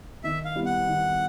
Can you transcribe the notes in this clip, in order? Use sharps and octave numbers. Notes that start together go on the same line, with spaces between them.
D#3 E5
F5
G3 B3 E4
F#5
D#3